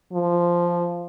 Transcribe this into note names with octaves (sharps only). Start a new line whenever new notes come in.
F3